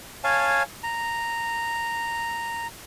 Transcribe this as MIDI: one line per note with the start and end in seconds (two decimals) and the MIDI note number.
0.24 0.63 73
0.24 0.63 77
0.24 0.63 80
0.24 0.63 81
0.83 2.67 82